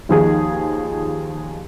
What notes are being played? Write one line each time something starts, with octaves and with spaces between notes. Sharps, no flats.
D#2 D#3 F3 D#4 G#4